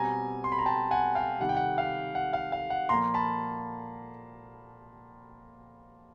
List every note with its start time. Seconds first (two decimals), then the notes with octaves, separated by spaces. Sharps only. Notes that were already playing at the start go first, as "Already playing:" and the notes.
Already playing: B2 G3 C4 G#5 A#5
0.44 C6
0.52 B5
0.59 A#5
0.66 G5 A5
0.91 F#5 G#5
1.15 F5 G5
1.40 C3 D#3 G3 F#5
1.49 G5
1.57 F#5
1.78 F5
2.15 F#5
2.33 F5
2.52 F5
2.70 F#5
2.89 A#2 F3 A#3 A#5 C6
3.14 A5 B5